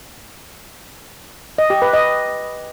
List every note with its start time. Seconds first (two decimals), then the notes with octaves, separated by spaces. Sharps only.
1.58 D#5
1.70 G4
1.82 B4
1.93 D#5